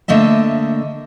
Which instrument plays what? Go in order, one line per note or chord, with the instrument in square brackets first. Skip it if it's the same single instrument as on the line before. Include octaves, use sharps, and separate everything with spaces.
[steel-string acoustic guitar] D3 A3 A#3 D#5 E5